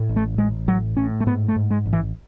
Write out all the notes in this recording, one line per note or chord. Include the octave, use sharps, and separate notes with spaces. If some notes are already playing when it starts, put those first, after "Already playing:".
Already playing: A2
A1
A3
A1 G#3
A2 F#3
A2 C#4
A3
G#2 B3
A3
G#2
G#3
A1
E3